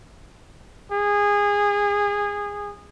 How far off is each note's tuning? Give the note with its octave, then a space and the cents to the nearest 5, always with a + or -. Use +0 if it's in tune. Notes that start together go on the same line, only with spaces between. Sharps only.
G#4 -20